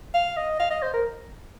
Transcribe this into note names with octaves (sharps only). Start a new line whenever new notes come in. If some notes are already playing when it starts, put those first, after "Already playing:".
F5
D#5
F5
D#5
C5
A#4